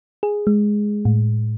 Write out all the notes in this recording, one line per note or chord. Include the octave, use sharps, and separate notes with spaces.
G#4
G#3
A2